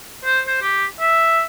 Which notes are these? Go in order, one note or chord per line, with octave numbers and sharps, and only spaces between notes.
C5
C5
G4
E5